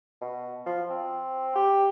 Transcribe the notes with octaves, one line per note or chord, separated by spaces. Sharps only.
B2
F3
C4
G4